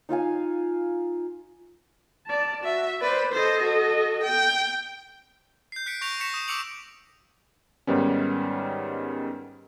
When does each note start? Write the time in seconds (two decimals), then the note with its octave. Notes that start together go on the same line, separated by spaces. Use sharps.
0.09 D#4 F4 F5 G#5
2.27 D5 A5
2.64 F#4 E5
3.02 B4 C5 D5
3.33 A4 C5 D#5
3.63 F#4
4.23 G5
5.72 G6 C7
5.86 F#6 B6 C#7 D7
6.01 C#6 G6 A#6 D7 F7
6.20 C#6 A#6 B6 C#7 E7
6.34 D#6 E7
6.48 D6 E6 C#7 D7 F7 F#7
7.87 G#2 D#3 G3 B3 C#4